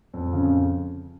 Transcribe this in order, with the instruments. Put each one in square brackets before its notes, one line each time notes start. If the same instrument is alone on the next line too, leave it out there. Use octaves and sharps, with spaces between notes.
[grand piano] F2
C#3